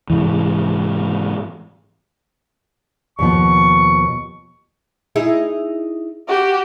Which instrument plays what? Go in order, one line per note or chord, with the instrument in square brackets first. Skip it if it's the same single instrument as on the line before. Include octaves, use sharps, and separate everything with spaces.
[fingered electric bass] G#2 C3 E3
[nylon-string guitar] D#2 B2 F3 [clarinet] C#6
[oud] D#4 E4 G#4
[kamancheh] F#4 G4